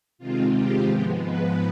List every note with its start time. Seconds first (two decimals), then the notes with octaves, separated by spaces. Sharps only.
0.18 C3 D#3 G#3 C4 F4
0.54 G4
0.89 G#2 F3 G#3 B3
1.23 B4